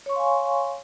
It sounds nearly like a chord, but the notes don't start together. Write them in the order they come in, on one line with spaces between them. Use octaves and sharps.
C#5 C#6 C6 F5 G#5